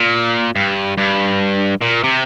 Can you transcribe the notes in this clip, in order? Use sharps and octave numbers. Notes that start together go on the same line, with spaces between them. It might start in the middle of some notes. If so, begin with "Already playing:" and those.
Already playing: A#2
G2
G2
A#2
C3